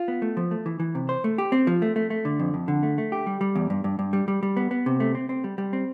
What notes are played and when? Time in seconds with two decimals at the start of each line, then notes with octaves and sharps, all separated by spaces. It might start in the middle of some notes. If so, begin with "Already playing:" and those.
Already playing: F4
0.08 B3
0.22 A3
0.37 F3
0.51 A3
0.66 E3
0.80 E3
0.95 C3
1.09 C5
1.24 A3
1.38 G4
1.52 C4
1.67 F3
1.82 A3
1.96 A3
2.10 A3
2.25 D3
2.39 F2
2.54 F2
2.68 D3
2.83 A3
2.98 A3
3.12 G4
3.27 G3
3.41 G3
3.55 E2
3.70 G2
3.84 G2
3.99 G2
4.13 G3
4.28 G3
4.43 G3
4.57 B3
4.71 B3
4.86 C3
5.00 A3
5.15 C4
5.29 C4
5.44 G3
5.58 G3
5.73 C4